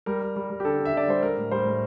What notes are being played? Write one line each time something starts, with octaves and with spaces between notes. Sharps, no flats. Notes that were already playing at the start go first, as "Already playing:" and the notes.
G3 A#4
G3
G3
G3
G4
D3 A4
D3
E5
D3 D5
G3 C5
G3 A#4
A2
G3 C5
A2